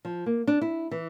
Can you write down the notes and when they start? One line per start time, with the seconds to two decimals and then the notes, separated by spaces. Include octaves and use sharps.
0.05 F3
0.26 A#3
0.47 D4
0.62 E4
0.91 E3